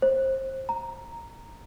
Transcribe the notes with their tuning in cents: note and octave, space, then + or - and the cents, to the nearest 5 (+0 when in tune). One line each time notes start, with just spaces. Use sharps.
C5 +25
A#5 -5